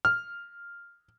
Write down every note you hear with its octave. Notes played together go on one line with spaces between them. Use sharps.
F6